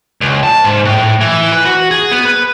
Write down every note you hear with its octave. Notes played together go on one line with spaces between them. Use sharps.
C#2
A5
G#2
A2
E3
B4
F#4
G#4
B3
B4